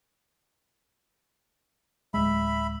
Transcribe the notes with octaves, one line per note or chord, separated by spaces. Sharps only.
D1 G#3 E5 B5